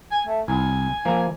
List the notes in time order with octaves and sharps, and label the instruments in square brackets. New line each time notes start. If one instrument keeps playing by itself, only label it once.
[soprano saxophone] G#5
A3
[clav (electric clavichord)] C2 [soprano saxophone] G#5
[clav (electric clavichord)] F3 A#3